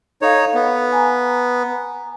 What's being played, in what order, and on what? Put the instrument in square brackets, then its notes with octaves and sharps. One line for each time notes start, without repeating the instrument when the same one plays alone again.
[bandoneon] D#4 C#5 [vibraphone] A4 F5
[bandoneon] B3
[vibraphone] G#5 A#5